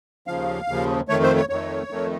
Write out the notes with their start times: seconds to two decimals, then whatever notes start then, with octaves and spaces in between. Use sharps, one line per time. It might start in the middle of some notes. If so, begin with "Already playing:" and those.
0.27 D#2 C#3 F3 F5
0.68 D#2 C#3 F3
1.09 F2 D#3 A3 C#5
1.23 C5
1.36 C#5
1.49 F2 D#3 A3 C#5
1.90 F2 D#3 A3